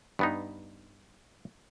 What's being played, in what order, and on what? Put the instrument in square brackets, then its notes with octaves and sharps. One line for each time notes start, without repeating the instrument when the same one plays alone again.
[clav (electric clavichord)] G2 B3 D#4